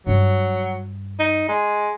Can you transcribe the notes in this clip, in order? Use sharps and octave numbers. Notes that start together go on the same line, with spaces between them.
G2 F#3 F4
D#4
G#3